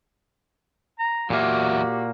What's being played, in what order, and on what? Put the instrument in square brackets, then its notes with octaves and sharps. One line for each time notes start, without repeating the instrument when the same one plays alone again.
[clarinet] A#5
[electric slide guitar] E2 F#3 E5 [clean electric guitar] A#2 A#3 [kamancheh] F#4 [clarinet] G4